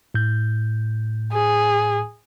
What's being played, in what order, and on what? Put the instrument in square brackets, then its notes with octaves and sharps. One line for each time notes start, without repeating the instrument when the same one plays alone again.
[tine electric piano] A2 G6
[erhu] G#4